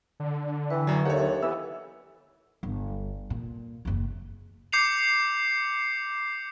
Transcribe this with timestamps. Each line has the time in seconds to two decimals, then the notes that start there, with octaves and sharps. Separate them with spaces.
0.20 D3
0.70 E3 B4 G5
0.87 F#2 F#3 C#6
1.05 D#2 G4 A4 C#5 E5 F#5
1.43 E3 B3 E6
2.63 G1
3.30 A#2
3.85 F#1 D#2
4.72 D6 G6 C7 C#7 F7